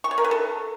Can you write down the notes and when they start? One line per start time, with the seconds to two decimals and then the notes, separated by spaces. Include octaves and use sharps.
0.04 C#6
0.11 C#5
0.18 A#4
0.24 B4
0.31 A4